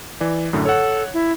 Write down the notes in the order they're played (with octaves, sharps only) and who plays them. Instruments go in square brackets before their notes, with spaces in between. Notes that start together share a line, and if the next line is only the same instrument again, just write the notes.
[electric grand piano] E3 D5
F#2 A2 D3
[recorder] A4 [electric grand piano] C#5 F#5
[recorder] E4